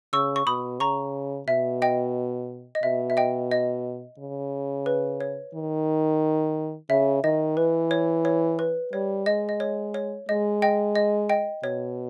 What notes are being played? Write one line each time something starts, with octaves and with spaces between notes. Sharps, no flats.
C#3 C#6 E6
C#6
B2 B5 D#6
C#3 A#5 C#6
B2 E5
D#5 G5
D#5
B2 E5
E5
D#5 G5
D#5
C#3
B4
C#5
D#3
C#3 E5
D#3 D#5
E3 B4
C#5
C#5
B4
G3 C#5
G#3 D#5
D#5
C#5
C#5
G#3 D#5
D#5 G5
D#5
D#5 G5
B2 C#5